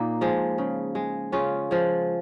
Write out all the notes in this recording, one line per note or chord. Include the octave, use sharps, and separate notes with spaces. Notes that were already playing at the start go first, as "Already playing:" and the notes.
Already playing: A#2 A#3 D#4
F3 G#3
C#3
G#3
C#3 C#4 F4
F3 G#3